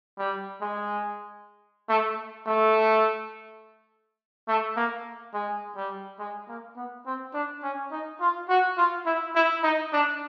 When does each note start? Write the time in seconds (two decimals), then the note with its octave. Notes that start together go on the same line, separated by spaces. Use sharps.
0.18 G3
0.61 G#3
1.89 A3
2.46 A3
4.48 A3
4.77 A#3
5.34 G#3
5.76 G3
6.19 G#3
6.48 A#3
6.76 B3
7.06 C4
7.34 D4
7.63 C#4
7.92 D#4
8.21 F4
8.49 F#4
8.77 F4
9.06 E4
9.35 E4
9.63 D#4
9.93 D4